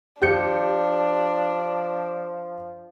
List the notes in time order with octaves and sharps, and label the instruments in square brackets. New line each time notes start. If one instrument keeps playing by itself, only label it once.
[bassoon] F3 [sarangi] D4 [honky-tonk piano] G4 G6 C#7